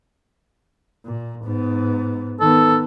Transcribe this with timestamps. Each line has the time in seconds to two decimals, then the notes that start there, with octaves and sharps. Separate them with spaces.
1.06 A#2
1.44 G#2 B3
2.40 D#3 B3 A4